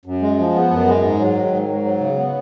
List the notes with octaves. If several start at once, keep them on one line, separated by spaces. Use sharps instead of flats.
F#2
G#3
F3
B3
F#2
G#3
G#2
F#3
D#3
G#2
G#2
F#3
C#3
B3